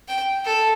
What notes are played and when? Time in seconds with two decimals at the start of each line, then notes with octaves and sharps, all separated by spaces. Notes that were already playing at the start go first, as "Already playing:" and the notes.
0.08 G5
0.45 A4